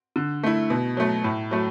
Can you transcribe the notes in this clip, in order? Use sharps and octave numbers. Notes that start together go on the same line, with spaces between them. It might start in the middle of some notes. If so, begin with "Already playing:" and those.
D3
A3 E4
B2
F#3 A3
A2
F#3 A3